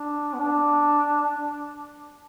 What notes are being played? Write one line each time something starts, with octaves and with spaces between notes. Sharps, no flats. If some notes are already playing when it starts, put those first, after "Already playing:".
Already playing: D4
B3
D4